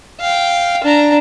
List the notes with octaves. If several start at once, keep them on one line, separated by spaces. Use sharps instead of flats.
F5 G5
D4 A#5